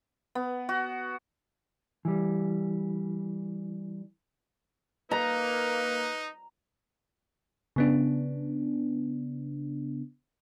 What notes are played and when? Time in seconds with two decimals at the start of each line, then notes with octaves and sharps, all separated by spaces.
0.35 B3
0.69 F#4
2.05 E3 G3
5.11 A#3 D#4 B4 A#5
7.76 C#3 B3 D4